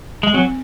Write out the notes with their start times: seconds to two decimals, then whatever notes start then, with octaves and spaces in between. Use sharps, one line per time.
0.23 G#3
0.34 F#3 C4